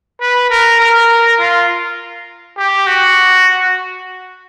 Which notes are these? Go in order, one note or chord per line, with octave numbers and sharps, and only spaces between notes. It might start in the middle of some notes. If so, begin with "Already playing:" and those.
B4
A#4
A#4
F4
G4
F#4